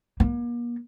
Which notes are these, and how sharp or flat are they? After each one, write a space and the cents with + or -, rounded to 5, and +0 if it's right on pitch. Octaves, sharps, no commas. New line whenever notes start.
A#3 +40